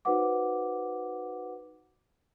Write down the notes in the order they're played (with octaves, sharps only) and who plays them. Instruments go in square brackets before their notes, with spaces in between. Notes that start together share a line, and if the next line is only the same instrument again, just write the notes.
[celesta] D#4 F#4 B4 C5 F#5 D6